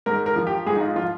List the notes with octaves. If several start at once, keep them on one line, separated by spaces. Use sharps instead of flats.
G#2 A#4
A#4
F3
G4
G#2 G#4
D#4
F4
F3 F4